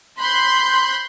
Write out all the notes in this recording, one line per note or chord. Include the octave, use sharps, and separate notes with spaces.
B5 C6 F#6 G6